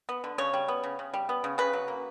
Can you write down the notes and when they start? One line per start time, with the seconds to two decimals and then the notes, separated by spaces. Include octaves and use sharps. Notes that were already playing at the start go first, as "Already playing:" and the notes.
0.09 B3
0.24 D3
0.38 C#3 C#5
0.54 G3
0.68 B3
0.84 C#3
0.99 C#3
1.14 G3
1.29 B3
1.44 C#3
1.58 C#3 B4
1.73 F#3
1.88 A#3